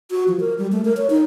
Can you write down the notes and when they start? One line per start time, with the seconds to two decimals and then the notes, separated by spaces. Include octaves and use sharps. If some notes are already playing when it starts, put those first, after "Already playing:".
0.11 F#4
0.28 F3
0.40 A#4
0.58 G3
0.72 A3
0.85 A#4
0.97 C#5
1.10 D#4